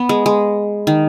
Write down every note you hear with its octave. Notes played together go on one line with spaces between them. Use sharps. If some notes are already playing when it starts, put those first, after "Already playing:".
Already playing: B3
G#3
G#3
D#3